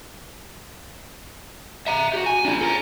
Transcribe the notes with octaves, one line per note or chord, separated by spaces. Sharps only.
E5 A#5
F#4 G4
G#5
D4 F4
A4 A#5